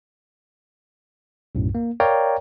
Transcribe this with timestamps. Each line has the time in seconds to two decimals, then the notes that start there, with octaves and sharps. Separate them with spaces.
1.55 B1 F#2 A2
1.75 A#3
2.00 A#4 C#5 D5 F5 G5 A#5